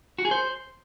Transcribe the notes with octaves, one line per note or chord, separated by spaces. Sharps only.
F#4
G#4
C5